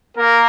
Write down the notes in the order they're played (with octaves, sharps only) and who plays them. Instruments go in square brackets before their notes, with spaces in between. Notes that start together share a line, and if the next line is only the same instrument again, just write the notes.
[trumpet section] A#3 A#4